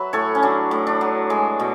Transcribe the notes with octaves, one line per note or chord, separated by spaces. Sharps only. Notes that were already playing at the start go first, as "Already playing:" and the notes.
Already playing: F#3 B4 E5
A2 A4 C#5
C#4
F#3 D4
A2
D4
F#3
G#3
B2